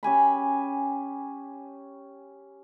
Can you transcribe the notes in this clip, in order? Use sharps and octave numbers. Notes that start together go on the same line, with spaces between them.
C#4 G4 G#5 B5